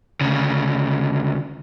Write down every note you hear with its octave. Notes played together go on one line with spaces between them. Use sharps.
D2 C#3